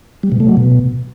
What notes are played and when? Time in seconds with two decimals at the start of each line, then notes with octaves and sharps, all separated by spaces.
0.23 G3
0.32 B2
0.40 A3
0.49 F#3
0.57 B2